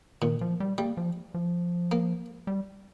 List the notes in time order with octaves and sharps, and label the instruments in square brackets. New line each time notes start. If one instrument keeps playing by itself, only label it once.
[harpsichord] A#2 [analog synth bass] D#3
[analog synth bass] F3
G3
[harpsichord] G3 [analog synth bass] A#3
[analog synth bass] F3
F3
[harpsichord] A#3
[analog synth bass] G3